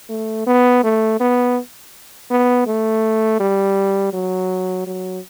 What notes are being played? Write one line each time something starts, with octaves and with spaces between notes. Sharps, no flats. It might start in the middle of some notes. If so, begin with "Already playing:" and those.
A3
B3
A3
B3
B3
A3
G3
F#3
F#3